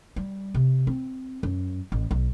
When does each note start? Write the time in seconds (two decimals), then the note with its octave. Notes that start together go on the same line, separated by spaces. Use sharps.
0.16 G3
0.54 C3
0.87 C4
1.43 F#2
1.92 A1
2.11 B1